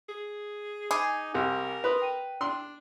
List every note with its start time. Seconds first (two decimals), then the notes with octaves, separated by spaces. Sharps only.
0.09 G#4
0.91 D#4 G#4 G#5 D6
1.34 C2 A#4
1.84 B4 C6 D#6
2.02 G5 D#7
2.41 D4 C6